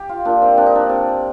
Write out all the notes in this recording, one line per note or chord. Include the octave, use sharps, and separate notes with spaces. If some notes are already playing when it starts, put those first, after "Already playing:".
Already playing: G4
F4
A#2 D4
C4
C3 D4
D#4
D4
C3